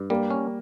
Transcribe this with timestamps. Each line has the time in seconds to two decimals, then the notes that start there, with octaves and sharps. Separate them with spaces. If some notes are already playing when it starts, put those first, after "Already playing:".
Already playing: G2
0.10 G3 A#3
0.30 C#4